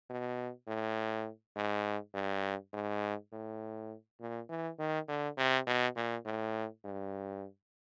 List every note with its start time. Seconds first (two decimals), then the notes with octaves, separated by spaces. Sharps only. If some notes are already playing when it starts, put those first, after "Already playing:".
0.10 B2
0.67 A2
1.56 G#2
2.14 G2
2.73 G#2
3.32 A2
4.20 A#2
4.49 E3
4.79 D#3
5.08 D3
5.38 C3
5.67 B2
5.96 A#2
6.25 A2
6.85 G2